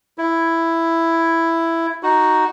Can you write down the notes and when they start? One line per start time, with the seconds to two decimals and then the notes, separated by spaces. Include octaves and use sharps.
0.18 E4
2.03 D#4 F#4